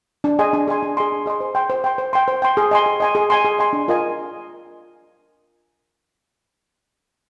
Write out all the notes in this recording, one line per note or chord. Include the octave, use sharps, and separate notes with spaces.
D4
G#4 D#5 G#5 C6
D4
G#4 D#5 G#5 C6
D4
G#4 D#5 G#5 C6
D4
G#4 D#5 G#5 C6
C5
G5 C6
C5
G5 C6
C5
G5 C6
C5
G5 C6
G#4
D#5 G#5 C6
G#4
D#5 G#5 C6
G#4
D#5 G#5 C6
G#4
D#5 G#5 C6
D4
F4 A#4 D#5 G#5